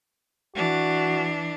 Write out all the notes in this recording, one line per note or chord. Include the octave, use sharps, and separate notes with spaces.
E3 D4 F#4